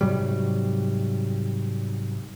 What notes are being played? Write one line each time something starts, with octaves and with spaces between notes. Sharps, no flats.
G#2 C3 F#3 G3